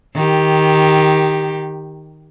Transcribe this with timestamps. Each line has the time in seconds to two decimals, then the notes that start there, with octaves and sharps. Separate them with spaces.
0.15 D#3 G4